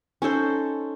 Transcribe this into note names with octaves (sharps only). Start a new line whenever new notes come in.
C#4 D#4 A4 C5